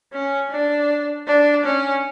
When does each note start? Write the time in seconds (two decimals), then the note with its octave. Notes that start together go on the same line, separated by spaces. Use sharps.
0.13 C#4
0.51 D4
1.27 D4
1.65 C#4